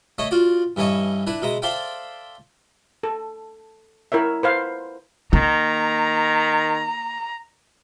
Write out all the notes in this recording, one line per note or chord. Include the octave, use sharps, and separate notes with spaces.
A3 C#5 D#5 E5
F4 F#4 D5
G2 E3 C#4 A4 D#5 C#6
D4 E4 B4
B2 G#3 E5 A#5
A4 C5 D5 E5 F5 G5
A4
E4 A#4 C#5 E5
B4 C5 F5
D#3 A#3 A#5